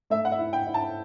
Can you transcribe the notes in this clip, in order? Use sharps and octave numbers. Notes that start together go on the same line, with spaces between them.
A3 E5
F#5
E5
E4
G5
E4
A5